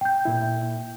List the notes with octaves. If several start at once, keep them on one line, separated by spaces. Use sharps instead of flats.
G5 G6
A#2 E4